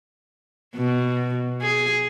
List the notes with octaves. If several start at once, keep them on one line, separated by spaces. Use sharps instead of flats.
B2
G#4